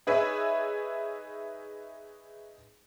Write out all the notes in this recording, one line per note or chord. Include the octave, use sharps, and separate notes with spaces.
D#4 G#4 B4 C#5 E5